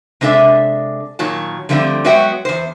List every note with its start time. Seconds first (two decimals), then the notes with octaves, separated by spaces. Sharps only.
0.21 C3 G#3 D4 A4 E5
1.19 A#2 D#3 F#3 A5
1.69 D3 F3 G3 A3 A#3 C4
2.04 F#3 G#3 B3 F#4 E5 G5
2.45 E2 C5